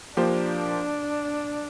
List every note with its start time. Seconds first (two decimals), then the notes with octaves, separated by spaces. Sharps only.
0.17 F3 A#3 D4 G4 C5